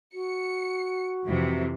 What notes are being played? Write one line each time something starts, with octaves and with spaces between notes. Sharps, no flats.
F#4 C#7
F2 C3 E3